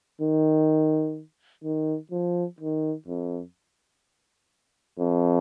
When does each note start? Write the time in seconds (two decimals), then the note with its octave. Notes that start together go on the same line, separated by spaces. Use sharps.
0.21 D#3
1.64 D#3
2.11 F3
2.60 D#3
3.07 F2
4.99 F2